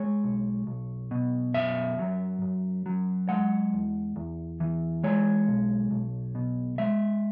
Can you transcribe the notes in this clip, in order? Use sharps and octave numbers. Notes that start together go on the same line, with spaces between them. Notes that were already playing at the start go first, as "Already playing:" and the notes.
Already playing: G#3 C#5
B1
B1
B2
F#2 E5
F#3
F#2
F#3
G#3 F#5
E2
E2
E3
G#3 C#5
B1
B1
B2
G#3 E5